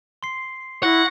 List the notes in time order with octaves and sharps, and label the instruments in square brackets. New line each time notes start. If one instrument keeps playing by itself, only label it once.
[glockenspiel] C6 C7
[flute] E4 [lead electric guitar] F#5 [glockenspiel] C#6 A#6